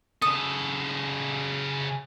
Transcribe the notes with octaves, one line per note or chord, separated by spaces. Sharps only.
C#3 A4 D#6